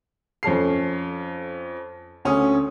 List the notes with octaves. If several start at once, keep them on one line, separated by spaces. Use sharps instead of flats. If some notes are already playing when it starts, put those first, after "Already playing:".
F2 C#4 A4 C7
D2 C#4 D#6